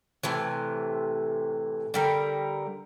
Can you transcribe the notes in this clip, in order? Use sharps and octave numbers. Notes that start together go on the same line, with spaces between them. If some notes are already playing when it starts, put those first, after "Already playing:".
A2 C3 E3
D3 G3 A#4